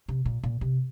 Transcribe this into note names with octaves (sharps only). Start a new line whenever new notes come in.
C3
A#2
A#2
C3